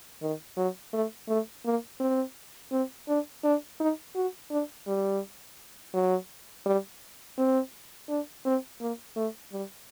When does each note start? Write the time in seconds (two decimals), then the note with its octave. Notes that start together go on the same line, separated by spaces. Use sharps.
0.22 D#3
0.57 F#3
0.93 A3
1.28 A3
1.65 A#3
2.00 C4
2.72 C4
3.08 D4
3.44 D4
3.80 D#4
4.16 F#4
4.51 D4
4.87 G3
5.94 F#3
6.66 G3
7.38 C4
8.09 D4
8.45 C4
8.81 A#3
9.16 A3
9.52 G3